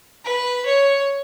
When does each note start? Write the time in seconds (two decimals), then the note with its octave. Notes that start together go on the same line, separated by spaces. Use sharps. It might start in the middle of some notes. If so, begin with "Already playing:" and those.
0.25 B4
0.65 C#5